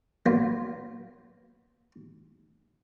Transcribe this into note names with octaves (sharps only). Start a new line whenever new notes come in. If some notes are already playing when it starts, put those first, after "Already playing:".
F#3 A#3 B3 F4 D5